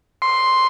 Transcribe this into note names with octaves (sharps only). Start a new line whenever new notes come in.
C6